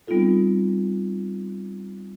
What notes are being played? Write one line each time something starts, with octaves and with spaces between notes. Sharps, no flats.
G3 B3 C4 D#4 F4 A4